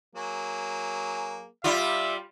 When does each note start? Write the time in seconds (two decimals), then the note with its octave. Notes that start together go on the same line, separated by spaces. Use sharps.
0.15 F#3 A#3 G#4
1.64 G3 F4 E5